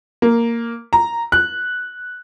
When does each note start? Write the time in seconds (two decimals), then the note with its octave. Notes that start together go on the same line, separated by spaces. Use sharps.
0.22 A#3
0.93 A#5
1.32 F#6